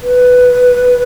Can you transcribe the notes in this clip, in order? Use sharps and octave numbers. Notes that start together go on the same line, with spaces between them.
B4